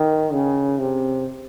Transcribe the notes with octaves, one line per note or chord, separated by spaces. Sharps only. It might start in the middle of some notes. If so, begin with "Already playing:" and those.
Already playing: D#3
C#3
C3